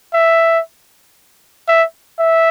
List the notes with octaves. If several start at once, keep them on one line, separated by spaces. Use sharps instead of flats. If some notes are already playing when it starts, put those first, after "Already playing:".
E5
E5
E5